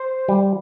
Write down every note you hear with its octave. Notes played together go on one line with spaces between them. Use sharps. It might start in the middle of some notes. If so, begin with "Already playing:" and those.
Already playing: C5
G3